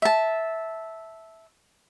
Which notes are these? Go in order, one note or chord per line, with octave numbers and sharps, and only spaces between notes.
E5 A5